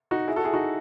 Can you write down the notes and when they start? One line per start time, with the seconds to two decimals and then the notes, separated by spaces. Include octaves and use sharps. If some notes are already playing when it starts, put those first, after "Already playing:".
0.11 D#4 F#4
0.28 E4 G#4
0.36 F#4 A4
0.44 E4 G#4
0.53 D#4 F#4